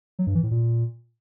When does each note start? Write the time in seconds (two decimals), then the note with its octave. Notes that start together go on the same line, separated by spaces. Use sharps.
0.19 F#3
0.27 G2
0.35 E3
0.43 A2
0.51 A#2